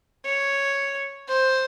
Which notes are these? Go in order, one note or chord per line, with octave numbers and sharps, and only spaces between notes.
C#5
C5